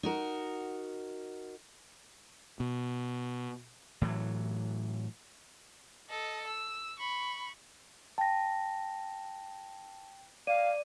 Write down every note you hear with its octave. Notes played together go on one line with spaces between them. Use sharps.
D#4 F#4 A#4
B2
A2 E3 F#3
A4 D#5
E6
B5 C#6
G5 A5 A#6
D5 F5 D#7